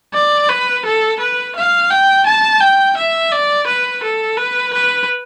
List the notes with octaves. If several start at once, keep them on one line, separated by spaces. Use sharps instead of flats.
D5
B4
A4
B4
F5
G5
A5
G5
E5
D5
B4
A4
B4
B4